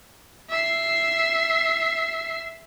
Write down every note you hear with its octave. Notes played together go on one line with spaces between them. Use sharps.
E5 C7